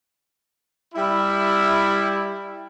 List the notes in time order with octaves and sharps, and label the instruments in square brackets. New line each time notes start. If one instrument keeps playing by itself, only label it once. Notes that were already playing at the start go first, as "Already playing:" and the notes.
[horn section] G3 E4